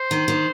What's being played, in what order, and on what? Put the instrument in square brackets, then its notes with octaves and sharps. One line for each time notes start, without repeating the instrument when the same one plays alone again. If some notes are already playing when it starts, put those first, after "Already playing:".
Already playing: [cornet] C5
[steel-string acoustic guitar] D#3
D#3